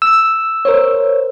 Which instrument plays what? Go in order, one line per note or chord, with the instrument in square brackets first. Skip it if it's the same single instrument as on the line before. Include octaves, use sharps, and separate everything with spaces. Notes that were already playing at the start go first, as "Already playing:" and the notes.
[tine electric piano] E6
[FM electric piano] A#4 C5 C#5